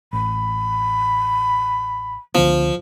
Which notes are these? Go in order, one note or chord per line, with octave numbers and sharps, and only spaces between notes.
A1 B5
C#2 D3 F3 B3